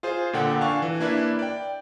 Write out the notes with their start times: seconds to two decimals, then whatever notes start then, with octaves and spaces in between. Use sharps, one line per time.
0.03 F4 G#4 C5
0.33 A#2 D3 A4 F#5 G5
0.61 D4 F5 G#5 C#6
0.82 E3
1.00 A#3 D4 E4 B4
1.39 D5 G5